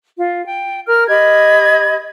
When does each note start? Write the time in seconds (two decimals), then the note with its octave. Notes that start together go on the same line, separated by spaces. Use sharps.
0.17 F4
0.45 G5
0.88 A#4 F6
1.09 G4 D#5 B5 G#6